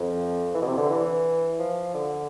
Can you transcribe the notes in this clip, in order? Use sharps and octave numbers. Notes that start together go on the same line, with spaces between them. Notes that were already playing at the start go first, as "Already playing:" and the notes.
Already playing: F2
E3
B2
C3
D3
E3
F3
D3